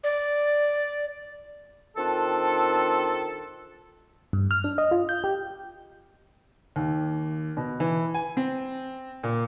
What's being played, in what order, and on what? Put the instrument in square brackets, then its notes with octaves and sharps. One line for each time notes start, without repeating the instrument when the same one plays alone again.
[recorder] D5
[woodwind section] D#3 C4 D4 F4 A4
[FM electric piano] G2
F6
D4
D#5
F4
G6
G4
[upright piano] D#2
B2
E3
G#5
C4
A#2